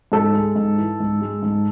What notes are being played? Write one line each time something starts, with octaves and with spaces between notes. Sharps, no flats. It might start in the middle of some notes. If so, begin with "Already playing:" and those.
G#2 A4
G#3
G#2
E3
G#2
G#3
G#2